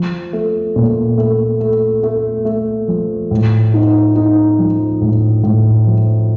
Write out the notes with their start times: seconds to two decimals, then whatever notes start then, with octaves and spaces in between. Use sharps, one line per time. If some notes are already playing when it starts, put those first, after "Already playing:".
Already playing: F3
0.33 A3
0.76 A#2
1.18 A3
1.60 A3
2.03 A3
2.45 A3
2.88 F3
3.31 A2
3.74 D#4
4.16 D#4
4.59 F3
5.01 A2
5.44 A2
5.87 F3